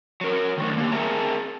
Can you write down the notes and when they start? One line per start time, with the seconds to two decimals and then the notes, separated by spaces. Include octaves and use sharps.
0.21 F#3 A#4
0.58 D#3 A3 D4
0.77 A#3 G4
0.92 C4 G#4 A#4 E5 A5 A#5